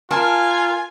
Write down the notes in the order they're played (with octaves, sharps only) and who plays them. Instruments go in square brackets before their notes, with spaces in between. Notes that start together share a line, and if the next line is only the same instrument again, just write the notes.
[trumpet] F4 [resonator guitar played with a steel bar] A#4 A5 [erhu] G#5